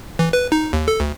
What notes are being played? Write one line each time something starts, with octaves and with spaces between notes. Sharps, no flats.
E3
B4
D#4
D#2
A4
D2